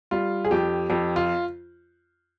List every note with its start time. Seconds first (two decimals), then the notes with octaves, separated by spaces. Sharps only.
0.11 G3 F4
0.45 G#4
0.51 F2 G4
0.89 F2 G4
1.16 F4